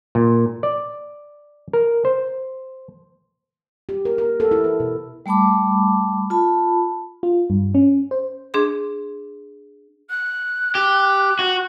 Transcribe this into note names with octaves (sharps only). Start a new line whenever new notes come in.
A#2
D5
A#4
C5
G4
A#4
A#4
A4
E4
B4
B2
G3 A3 A5 B5 D6
F4 A5 B5
F4
G2
C#4
C5
D4 G#4 C6
F#6
G4
F#4